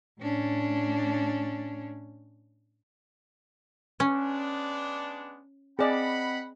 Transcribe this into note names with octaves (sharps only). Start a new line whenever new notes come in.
A2 C#4 D4
G#3 B3 C#4 D4
C4 G#4 D5 D#5 F#5 B5